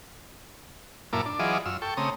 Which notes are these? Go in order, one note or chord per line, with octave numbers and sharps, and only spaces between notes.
F#2 A#2 A#3 E4 A5 D6
D4
E3 F#3 F4 G#4 D5 D#5
F#2 F4 E6
A4 G5 C#6
C#3 A3 C4 A#5 D#6